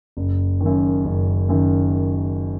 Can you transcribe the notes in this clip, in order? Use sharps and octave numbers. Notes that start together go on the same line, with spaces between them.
F#1
F#2 D#3
F#1
F#2 D#3